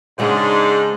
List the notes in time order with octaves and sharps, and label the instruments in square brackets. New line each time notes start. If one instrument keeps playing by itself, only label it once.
[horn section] G#2 D4 [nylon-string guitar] C#3 G#3 F#5